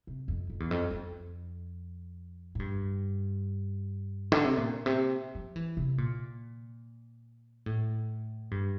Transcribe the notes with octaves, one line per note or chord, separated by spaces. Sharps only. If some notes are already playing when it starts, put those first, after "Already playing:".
C3
F2
F2
E2
F2
F2
A2
G2
D3
C3
A#2
C3
F3
E3
C3
A#2
A2
G2